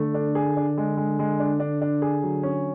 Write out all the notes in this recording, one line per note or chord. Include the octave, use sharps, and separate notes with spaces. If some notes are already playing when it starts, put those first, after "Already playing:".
Already playing: D3 A3
D4
G#4
D4
G#3
G#3
G#3
D4
D4
D4
G#4
F#3
C#4